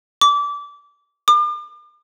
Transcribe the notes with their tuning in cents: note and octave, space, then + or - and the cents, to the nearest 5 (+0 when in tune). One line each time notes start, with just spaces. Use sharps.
D6 -25
D6 +40